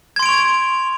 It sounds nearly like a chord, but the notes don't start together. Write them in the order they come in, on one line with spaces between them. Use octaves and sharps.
G#6 C6 D7 F7 C#6